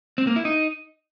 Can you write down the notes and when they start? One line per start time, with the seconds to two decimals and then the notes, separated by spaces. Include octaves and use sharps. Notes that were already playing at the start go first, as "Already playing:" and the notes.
0.18 C4
0.27 A#3
0.36 E4
0.45 D#4